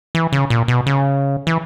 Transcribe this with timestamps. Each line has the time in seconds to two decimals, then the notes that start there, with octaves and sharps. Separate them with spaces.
0.15 E3
0.33 C#3
0.50 A#2
0.68 B2
0.87 C#3
1.47 E3